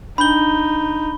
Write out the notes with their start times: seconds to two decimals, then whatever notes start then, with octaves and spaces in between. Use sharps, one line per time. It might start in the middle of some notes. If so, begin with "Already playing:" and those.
0.18 D4 D#4 B5 G6 G7